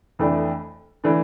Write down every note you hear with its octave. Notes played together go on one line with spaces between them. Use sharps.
F2 E3 A3 D4
E3 A3 D4